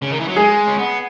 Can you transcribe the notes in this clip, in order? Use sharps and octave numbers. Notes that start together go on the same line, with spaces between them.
C#3
D#3
E3
F#3
G#3 G#4
C#4
B3